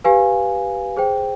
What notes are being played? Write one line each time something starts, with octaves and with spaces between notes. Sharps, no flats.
G4 B4 F5 G#5
G#4 C5 G5